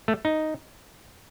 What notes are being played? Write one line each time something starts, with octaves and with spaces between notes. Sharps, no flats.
A3
D#4